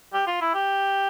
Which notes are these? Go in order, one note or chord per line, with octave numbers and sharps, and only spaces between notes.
G4
F4
E4
G4